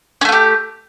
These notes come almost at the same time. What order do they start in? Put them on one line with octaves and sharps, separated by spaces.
C#4 A3 F4 G4